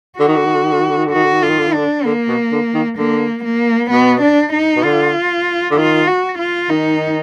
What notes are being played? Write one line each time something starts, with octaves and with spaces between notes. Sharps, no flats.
D3 F#4
D#3
D3
D#3
D3
D#3
D3
D#3
D3
D#3
D3
D#3 F#4
D3
D#3
D3 F4
D#3
D3
D#3
D3 D4
D3 A#3
B2
D3
D#3
D3 A#3
A#3
B2 B3
D4
D#4
B2
D3 F4
D3
D#3 F4
F#4
F4
D#3 D#4